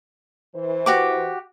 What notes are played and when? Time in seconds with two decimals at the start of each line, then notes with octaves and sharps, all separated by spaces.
0.55 E3 C5
0.86 F#4 G4 D6